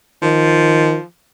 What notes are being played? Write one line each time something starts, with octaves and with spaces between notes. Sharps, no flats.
D#3 F3